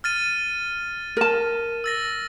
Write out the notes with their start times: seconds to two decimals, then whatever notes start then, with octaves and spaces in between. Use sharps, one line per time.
0.04 F6 A6 D#7
1.17 A#4 A5
1.84 E6 A6 A#6